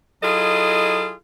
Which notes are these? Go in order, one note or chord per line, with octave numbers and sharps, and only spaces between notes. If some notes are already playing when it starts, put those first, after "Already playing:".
F#3 E4 F4 G#4 A4 D#5